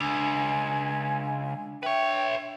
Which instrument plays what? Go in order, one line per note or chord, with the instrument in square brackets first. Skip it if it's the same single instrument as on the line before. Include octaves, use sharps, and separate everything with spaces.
[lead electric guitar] C#2 [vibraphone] D4 [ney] G#5
[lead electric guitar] B4 C#5 [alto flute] E5 [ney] G5